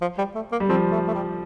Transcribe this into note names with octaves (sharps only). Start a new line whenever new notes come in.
F3
G3
A3
A#3
G3
F3 C4
A3
A3
G3